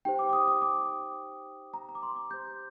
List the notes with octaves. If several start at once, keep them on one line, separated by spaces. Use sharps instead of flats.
D#4 G4 C5 G5
D6
D6
D#6
D#6
D6
A#5
A#5
D6
C6
D6
G4 C5 G6